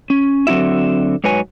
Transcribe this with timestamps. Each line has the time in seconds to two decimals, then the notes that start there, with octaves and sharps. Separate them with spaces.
0.10 C#4
0.47 D3 F#3 C4 E4 F#4 E5
1.24 G#2 F#3 B4 C#5 G#5